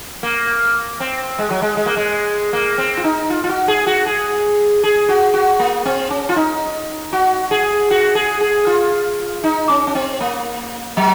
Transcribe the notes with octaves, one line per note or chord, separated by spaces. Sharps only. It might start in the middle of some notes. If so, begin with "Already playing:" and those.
A#3
C4
G#3
F#3
G#3
G#3
A#3
G#3
A#3
C4
F4
D#4
F4
F4
F#4
G#4
F#4
G#4
G#4
F#4
F#4
A#3
C4
C#4
F4
D#4
F#4
G#4
F#4
G#4
G#4
F4
D#4
C#4
C#4
C4
A#3
F#3